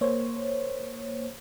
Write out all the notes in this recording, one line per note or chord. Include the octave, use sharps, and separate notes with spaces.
A#3 C5 C#5